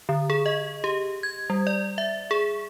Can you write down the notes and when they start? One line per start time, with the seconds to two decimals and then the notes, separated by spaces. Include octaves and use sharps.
0.09 D3
0.30 G#4
0.46 D#5
0.84 G4
1.23 G#6
1.50 G3
1.67 D5
1.98 E5
2.31 G#4